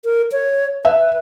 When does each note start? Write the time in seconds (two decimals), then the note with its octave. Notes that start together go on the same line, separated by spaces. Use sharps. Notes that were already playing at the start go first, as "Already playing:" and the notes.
0.05 A#4
0.32 C#5
0.85 B4 E5